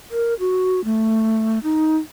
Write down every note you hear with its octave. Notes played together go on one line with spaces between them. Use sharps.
A#4
F#4
A3
D#4